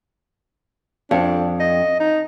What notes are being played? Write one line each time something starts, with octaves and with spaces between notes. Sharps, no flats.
F2 D4
D#5
D#4